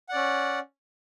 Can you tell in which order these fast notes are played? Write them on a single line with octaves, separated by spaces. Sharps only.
F#5 D5 C#4